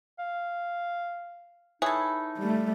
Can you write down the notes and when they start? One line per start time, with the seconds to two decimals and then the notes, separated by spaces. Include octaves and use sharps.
0.19 F5
1.82 D#4 E4 G#4 A4 B4 C#5
2.38 G3 A3